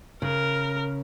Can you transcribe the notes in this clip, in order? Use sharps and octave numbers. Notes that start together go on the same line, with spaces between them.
C#3 A#4